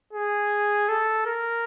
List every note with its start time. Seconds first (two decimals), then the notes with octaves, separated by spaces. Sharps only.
0.13 G#4
0.89 A4
1.26 A#4